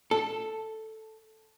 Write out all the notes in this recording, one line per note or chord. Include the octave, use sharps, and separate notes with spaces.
A4